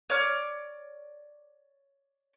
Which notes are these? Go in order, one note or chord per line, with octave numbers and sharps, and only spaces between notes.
C#5 D5 D6 F6